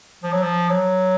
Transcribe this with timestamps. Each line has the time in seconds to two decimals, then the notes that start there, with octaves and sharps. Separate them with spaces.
0.23 F3
0.32 F#3
0.42 F3
0.69 F#3